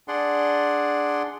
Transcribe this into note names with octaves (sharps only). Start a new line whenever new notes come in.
D4 G#4 D5 F#5 C6